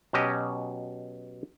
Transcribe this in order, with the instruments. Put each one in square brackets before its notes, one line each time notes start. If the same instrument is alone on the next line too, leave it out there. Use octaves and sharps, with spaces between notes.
[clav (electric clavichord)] B2 F#3 C#4 G4 D#5